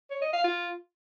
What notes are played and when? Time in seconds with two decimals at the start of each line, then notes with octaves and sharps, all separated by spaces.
0.11 C#5
0.22 D#5
0.33 F5
0.44 F4